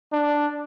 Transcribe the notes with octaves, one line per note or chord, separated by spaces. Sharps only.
D4